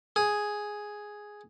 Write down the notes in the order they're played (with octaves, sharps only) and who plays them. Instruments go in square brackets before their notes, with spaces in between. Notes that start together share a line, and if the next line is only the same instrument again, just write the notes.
[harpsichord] G#4